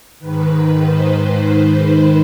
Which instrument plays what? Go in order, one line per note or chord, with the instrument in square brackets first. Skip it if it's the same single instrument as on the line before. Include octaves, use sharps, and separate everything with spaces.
[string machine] G#2 D#3 B4
C5